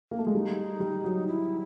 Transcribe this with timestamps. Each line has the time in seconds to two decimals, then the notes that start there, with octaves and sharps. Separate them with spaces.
0.11 A#3
0.19 A3
0.27 G#3
0.34 G3 D#4
0.80 G3
1.04 F#3
1.27 E4